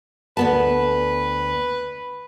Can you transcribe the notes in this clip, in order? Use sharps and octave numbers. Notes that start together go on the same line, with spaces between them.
D2 B3 B4 A5